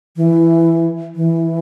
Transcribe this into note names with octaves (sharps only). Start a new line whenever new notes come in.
E3
E3